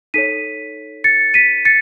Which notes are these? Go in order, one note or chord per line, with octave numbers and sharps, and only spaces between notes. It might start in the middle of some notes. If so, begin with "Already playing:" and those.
D#4 A4 C#5 B6 D#7
A6 C#7
B6 D#7
A6 C#7